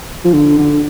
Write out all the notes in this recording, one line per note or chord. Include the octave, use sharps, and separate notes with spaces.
F3
D3
D3